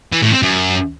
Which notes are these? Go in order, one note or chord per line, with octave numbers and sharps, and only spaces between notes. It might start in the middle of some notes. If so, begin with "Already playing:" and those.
E3
A2
C4
F#2